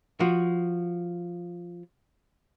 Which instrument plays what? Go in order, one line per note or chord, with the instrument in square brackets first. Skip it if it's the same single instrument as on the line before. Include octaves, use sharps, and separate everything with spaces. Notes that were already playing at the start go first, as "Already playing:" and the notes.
[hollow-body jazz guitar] F3 F#4